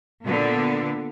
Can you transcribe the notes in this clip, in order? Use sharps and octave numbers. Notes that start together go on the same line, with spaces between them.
A#2 D3 B3